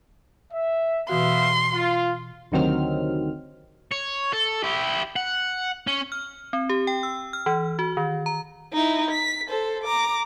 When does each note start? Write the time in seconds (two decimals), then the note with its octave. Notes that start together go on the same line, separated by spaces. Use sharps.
0.53 E5
1.09 B2 E3 B3 F#4 E5 F5 C6
1.74 F4
2.52 D2 C3 D#3 F#3 C4 F6
3.91 C#5
4.33 A4
4.63 E4 G4
5.16 F#5
5.87 C#4
6.12 F6
6.53 C4
6.69 G4
6.87 G5
7.03 E6
7.33 F6
7.46 E3
7.79 F#4
7.97 D#3
8.26 A#5
8.73 D#4 E4
9.11 B6
9.49 A4 C5
9.83 A#5 D6